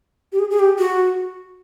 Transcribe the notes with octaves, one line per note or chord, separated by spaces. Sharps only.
G4
G#4
G#4
G4
F#4